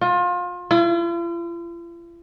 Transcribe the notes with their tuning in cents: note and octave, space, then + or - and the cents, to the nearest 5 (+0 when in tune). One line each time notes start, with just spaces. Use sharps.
F4 +30
F4 -45